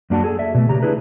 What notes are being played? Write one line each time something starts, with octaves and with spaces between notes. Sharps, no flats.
F#2 A#3 D4 F#4 F#5 A5
G#4 A4
D5 E5
B2 A3
C#3 G4 A#5
D4 E4 G#4 B4